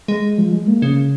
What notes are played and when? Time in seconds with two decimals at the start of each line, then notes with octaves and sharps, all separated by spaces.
0.08 G#3
0.38 F3
0.52 G#3
0.68 A#3
0.82 C#3